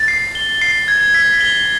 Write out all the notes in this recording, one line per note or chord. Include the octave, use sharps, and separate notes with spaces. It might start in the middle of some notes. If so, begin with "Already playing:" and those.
Already playing: A6
C7
G7
C7
G#6
B6
G7